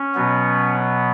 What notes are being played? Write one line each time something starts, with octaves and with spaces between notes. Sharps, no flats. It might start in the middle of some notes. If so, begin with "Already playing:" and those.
Already playing: C#4
B2 F#3 B3